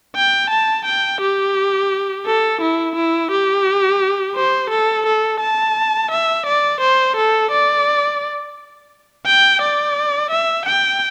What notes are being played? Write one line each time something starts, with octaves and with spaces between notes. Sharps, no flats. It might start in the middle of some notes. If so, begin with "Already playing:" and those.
G5
A5
G5
G4
A4
E4
E4
G4
C5
A4
A4
A5
E5
D5
C5
A4
D5
G5
D5
E5
G5